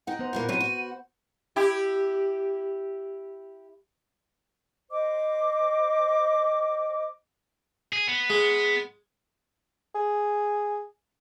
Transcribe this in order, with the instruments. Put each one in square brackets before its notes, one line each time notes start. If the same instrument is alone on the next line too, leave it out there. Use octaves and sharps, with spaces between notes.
[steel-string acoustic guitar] D#4 F#5 [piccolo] G5
[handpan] B3 C5 [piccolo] A#5
[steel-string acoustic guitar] E2 A#2 A#3 [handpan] B4
[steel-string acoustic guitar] A2 C3 F#3 [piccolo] D#7
[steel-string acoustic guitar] F#4
[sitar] E4 G4
[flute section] C5 D#5 D6
[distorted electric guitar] G#4
B3
[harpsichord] G#3
[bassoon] G#4